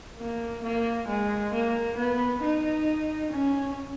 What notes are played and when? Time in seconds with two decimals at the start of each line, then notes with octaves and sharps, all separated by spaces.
0.18 A#3
0.63 A#3
1.08 G#3
1.53 A#3
1.97 B3
2.42 D#4
3.32 C#4